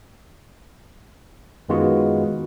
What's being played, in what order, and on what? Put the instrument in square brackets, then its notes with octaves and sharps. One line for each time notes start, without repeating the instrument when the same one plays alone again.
[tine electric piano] F#2 D#3 G#3 B3 F4 F#4